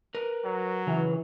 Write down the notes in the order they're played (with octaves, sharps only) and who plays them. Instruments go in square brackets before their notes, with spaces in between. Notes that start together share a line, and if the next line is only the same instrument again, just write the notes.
[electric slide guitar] A#4 B4
[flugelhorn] F#3
[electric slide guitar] C#3 F4 [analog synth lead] E3